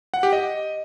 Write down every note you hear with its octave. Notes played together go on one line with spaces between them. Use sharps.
F#5
G4
D#5